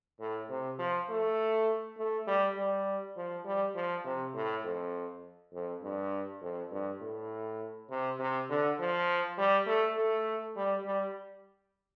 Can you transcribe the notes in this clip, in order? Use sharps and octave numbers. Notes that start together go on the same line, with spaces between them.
A2
C3
F3
A3
A3
G3
G3
F3
G3
F3
C3
A2
F2
F2
G2
F2
G2
A2
C3
C3
D3
F3
G3
A3
A3
G3
G3